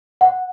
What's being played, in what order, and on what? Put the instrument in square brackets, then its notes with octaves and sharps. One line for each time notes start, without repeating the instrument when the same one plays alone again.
[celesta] F#5